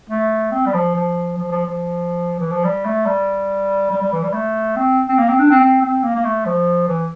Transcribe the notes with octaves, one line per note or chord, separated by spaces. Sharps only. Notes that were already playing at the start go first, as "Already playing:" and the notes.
A3
C4
G3
F3
F3
F3
F3
F3
E3
F3
G3
A3
G3
G3
G3
E3
G3
A3
C4
C4
A#3
C4
D4
C4
C4
C4
A#3
A#3
A3
F3
E3